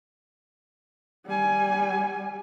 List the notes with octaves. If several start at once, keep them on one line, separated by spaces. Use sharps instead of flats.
G3 G#5